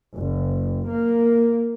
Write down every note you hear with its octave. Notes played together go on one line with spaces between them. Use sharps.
F#1
A#3